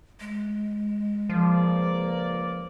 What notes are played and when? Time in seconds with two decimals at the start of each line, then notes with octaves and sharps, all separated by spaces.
0.20 G#3
1.29 C#2 F3 A#3 D5